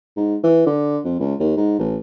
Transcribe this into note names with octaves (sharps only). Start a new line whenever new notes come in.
G#2
E3
D3
F2
C#2
D#2
G#2
A1